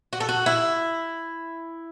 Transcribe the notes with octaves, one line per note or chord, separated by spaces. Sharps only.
F#4
A4
F#4
E4